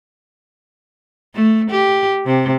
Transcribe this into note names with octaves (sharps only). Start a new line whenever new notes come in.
A3
G4
C3